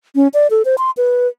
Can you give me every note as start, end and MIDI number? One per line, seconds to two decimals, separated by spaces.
0.15 0.28 61
0.34 0.47 74
0.51 0.62 69
0.65 0.76 72
0.78 0.91 84
0.97 1.28 71